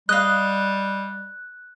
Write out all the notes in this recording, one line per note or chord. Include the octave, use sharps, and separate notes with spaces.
G3 D#5 F5 F#6